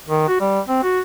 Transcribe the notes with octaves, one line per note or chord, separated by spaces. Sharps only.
D#3
F#4
G3
C4
F#4